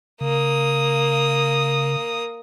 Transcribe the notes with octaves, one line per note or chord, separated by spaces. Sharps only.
C#3 A#3 D#6